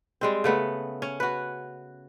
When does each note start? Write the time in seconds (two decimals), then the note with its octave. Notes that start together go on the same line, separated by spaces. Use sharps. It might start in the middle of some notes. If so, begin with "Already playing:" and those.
0.21 G3 G#3 C4
0.44 C#3 A3 B3
1.02 C#4
1.20 F#4 B4